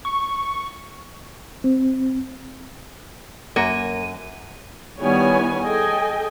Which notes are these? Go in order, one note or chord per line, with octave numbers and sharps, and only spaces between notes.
C#6
C4
F#2 A#3 F#4 G#5 D#7
D#3 G3 B3 E4 C#5 G#5
G#4 A4 D#5 G5 G#5